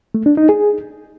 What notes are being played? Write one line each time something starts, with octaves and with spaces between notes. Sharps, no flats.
A3
D4
D#4
G#4